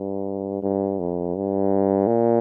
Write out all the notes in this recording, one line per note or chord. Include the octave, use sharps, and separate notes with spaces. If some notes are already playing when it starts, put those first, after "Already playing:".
Already playing: G2
G2
F2
G2
A#2